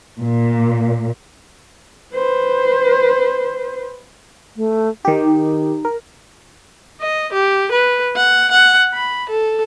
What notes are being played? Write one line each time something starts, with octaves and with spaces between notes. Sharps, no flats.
A#2
B4 C5
A3
D#3 D#4 G4
A#4
D#5
G4
B4
F#5
F#5
B5
A4